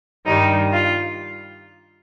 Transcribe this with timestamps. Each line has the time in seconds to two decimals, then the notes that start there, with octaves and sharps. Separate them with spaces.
0.25 G2 D#3 G3 D#4
0.73 F4